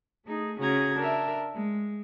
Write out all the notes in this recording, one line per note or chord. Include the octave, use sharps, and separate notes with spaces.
A3 D#4 G#4
C#3 C#4 F#4 G#4 A#5 G#6
D4 A#4 E5
G#3